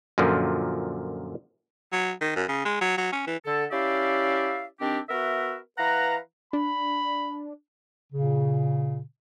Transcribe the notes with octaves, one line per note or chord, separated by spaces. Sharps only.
F#2 A#2 D3 F3
F#3
D#3
F#2
C#3
G#3
F#3
F#3
C#4
E3
D3 A4
C#4 E4 G4 D5 E5 F5
D#3 C4 D4 G4
B3 F#4 A#4 E5
E3 B4 F5 F#5 A#5
D4 B5
A#2 C#3